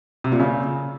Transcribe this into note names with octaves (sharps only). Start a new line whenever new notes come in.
C3
A#2
C#3